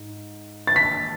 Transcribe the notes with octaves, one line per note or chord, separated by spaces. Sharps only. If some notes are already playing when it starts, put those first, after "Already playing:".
Already playing: G#2
A6
B6